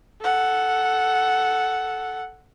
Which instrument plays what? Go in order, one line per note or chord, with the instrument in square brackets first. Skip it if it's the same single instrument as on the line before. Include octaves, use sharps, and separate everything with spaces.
[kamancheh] A4 F#5